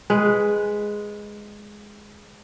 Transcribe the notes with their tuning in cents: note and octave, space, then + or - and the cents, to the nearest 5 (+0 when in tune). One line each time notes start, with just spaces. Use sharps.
G#3 +0 B4 +0